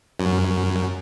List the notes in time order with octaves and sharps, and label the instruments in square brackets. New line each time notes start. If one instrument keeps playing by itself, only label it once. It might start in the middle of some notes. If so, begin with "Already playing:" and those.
[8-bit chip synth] F#2